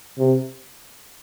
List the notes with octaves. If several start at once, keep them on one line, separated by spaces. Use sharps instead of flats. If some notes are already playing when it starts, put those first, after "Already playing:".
C3